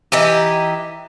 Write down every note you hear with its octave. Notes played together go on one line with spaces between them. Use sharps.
E3 D#4 G4